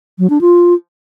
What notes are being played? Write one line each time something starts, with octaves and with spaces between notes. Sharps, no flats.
F#3
D4
F4